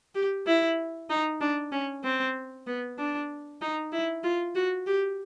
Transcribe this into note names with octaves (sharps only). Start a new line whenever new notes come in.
G4
E4
D#4
D4
C#4
C4
B3
D4
D#4
E4
F4
F#4
G4